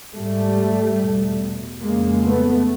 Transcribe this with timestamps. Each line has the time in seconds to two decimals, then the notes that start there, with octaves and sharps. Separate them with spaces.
0.14 G#2 G3 A3
0.99 E2 B2
1.82 F2 C#3 G#3 A#3
2.24 A3 B3